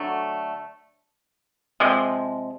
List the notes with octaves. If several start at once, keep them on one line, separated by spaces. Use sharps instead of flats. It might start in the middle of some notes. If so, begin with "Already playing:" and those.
Already playing: D3 F#3 A3
C3 F3 G#3